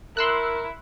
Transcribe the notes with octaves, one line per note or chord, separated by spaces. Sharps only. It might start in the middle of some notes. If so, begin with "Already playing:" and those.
E4 A#4 C6 E6 F#6